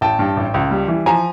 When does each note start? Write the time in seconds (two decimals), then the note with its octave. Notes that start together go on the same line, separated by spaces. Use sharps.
0.01 A1 G5 A5
0.19 G2
0.37 A1
0.54 C#2
0.71 G3
0.88 E3
1.06 F3 G#5 A#5